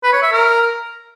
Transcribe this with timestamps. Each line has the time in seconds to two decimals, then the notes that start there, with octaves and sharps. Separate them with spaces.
0.03 B4
0.13 C#5
0.23 E5
0.32 A#4